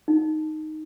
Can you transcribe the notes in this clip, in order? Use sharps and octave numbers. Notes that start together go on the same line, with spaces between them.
D#4